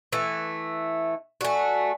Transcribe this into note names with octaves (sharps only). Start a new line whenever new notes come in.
E3 A3 E5
A3 F#4 D5 G#5